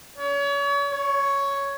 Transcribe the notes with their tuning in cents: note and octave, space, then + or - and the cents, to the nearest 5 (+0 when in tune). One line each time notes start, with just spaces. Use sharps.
C#5 +35
C#5 +5